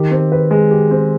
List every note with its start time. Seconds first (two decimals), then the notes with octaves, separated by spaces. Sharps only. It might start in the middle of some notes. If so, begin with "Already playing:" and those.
Already playing: D#3 G4
0.11 C4
0.32 B4
0.51 G#3
0.71 G4
0.91 C4